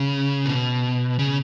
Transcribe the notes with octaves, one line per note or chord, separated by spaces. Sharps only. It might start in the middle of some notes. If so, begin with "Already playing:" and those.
Already playing: C#3
B2
C#3